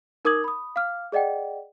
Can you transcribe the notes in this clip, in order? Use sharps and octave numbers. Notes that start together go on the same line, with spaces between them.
D#4 A#4 D6 D#6 G#6 F#7
B5 D#6
F5 D6 F6
G#4 D5 D#5 F#5 G5